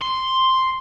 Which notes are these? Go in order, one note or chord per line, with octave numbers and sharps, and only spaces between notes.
C6